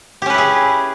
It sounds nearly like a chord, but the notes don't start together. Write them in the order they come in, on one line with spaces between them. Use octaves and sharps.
G4 C#4 B4 E4 G#4